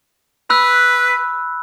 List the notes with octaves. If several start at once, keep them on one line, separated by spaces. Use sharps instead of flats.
B4 B5 E6 F#6